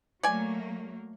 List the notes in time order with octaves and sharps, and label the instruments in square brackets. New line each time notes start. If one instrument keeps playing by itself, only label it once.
[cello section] F#3 A3 A#3 [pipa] D5 G#5